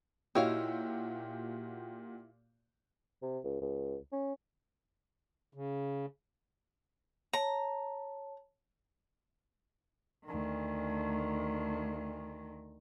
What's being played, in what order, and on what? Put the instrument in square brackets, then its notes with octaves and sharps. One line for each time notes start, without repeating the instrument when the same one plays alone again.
[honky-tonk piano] A#2 F#4 G4 [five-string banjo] D#4 C#5 F5 [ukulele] E4
[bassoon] C3
C#2
C#2
C#4
[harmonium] C#3
[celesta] C#5 A5 [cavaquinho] A#5
[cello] D2 D#3